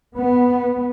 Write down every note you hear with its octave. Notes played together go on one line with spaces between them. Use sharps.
B3